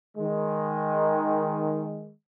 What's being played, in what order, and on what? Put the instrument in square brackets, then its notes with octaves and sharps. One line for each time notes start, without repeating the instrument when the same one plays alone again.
[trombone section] D#3 G#3